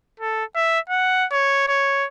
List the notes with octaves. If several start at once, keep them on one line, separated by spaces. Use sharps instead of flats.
A4
E5
F#5
C#5
C#5